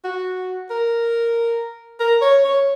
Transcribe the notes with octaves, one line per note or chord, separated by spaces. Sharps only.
F#4
A#4
A#4
C#5
C#5